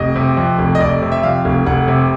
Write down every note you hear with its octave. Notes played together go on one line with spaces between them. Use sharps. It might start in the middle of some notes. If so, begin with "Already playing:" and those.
Already playing: F1 D#5
C3
F2
F1
D#5
F1 D5
C3
E5
F2 F5
F1
F1 F#5
C3